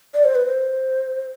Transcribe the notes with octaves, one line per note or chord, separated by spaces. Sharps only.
D5
C5
B4
C5